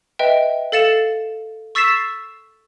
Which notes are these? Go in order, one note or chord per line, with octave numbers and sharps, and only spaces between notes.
B4 D#5 E5 G5
A4 F5 A6 C#7 E7
C#6 E6 A6 B6 C7 E7